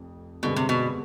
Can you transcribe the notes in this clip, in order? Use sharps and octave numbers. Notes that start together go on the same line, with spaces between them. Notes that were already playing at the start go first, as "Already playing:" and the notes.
Already playing: F1 F2
G2 B2 D3 G#3 C4
C3
B2